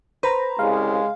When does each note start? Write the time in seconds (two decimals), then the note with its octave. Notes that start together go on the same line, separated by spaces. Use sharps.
0.23 B4 C5 A#5
0.59 C2 C#3 G#3 F5